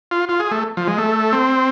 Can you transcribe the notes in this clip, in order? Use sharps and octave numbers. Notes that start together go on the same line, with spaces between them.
F4
F4
G#4
A3
F3
G#3
A3
C4